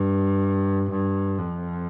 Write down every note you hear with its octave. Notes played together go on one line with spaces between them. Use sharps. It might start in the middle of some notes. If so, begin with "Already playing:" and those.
Already playing: G2
G2
F2